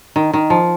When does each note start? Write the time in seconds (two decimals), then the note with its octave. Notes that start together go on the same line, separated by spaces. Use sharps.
0.16 D#3
0.33 D#3
0.50 F3